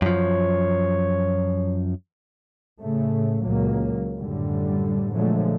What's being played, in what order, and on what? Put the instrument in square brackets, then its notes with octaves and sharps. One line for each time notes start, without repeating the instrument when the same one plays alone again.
[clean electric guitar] F#2 F3 [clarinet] C#5
[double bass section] A2 C#3 A3
C#2 A#2 F#3 A#3
F#2 A2 D3 G3
A#2 D3 F3 F#3 G#3 A3